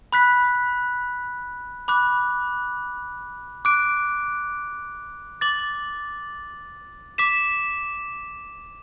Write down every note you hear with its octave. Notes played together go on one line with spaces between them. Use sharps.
B5 F#6 B6
B5 D6 F#6
D6 F#6 D7
D6 A6 F#7
D6 B6 E7